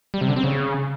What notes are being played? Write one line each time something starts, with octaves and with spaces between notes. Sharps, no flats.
G3
C3
D3
C4
C#3